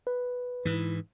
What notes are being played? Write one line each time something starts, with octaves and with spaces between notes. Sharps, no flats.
B4
G#2 E3 E4